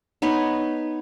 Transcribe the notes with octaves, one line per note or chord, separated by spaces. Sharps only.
B3 D#4 B4 C#5